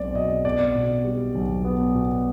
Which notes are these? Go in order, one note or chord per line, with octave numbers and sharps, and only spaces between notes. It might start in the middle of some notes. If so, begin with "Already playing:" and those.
Already playing: B1 B2 G#3 C4 D5
B2 D#5
B3 D5
B2
G3
B1
B3
B2